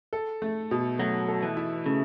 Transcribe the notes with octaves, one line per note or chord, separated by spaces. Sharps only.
A4
A3
B2
F#3 A3
A4
E3
E4
C#3 A3